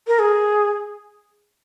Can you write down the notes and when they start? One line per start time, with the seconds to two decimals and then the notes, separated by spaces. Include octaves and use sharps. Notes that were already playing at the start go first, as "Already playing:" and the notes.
0.07 A#4
0.19 G#4